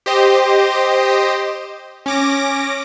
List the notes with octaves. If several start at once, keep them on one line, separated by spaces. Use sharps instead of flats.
G4 C5 D#5
C#4 D6 A#6